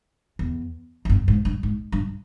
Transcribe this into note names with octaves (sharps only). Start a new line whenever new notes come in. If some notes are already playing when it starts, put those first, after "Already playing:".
E2
E2
G2
G#2
G2
G#2
G2